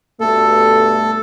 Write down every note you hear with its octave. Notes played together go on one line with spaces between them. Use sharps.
G2 B2 A3 A4